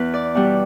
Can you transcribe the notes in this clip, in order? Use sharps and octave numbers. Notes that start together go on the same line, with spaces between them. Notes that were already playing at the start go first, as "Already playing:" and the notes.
Already playing: E2 B4
D5
B2 G3 F#5